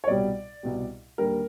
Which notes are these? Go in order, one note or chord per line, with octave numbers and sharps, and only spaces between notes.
C#5
C2 B2 G3 D5
C2 B2 G3
D#2 D3 G3 A#4